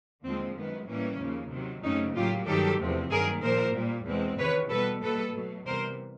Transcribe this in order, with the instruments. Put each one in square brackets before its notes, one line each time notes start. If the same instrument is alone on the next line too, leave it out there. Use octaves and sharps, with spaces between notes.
[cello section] D#2 D3 F3 G#3 C4
F#2 D#3 G#3 B3
A2 E3 G3 A#3 C#4
D#2 C#3 F3 A#3
C3 D#3 F#3
F#2 C#3 F#3 A3 C4 C#4 D#4
A2 F#3 A#3 F4 G4
G2 D#3 F#3 G4 A4
E2 C3 F3 A3 C4
G2 D#3 F#3 A#3 G#4 A#4
A#2 F3 A#3 A#4 C5
A#2 G3 A#3
E2 B2 G#3 C4
E2 C3 D#3 B4 C#5
B2 G3 B3 A4 B4
B2 G3 A#3 A4 B4
B2 F#3 A3
C3 E3 G3 B3 A#4 C5